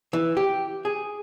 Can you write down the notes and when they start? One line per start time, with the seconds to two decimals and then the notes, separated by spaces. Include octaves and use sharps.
0.13 E3
0.37 G4
0.85 G#4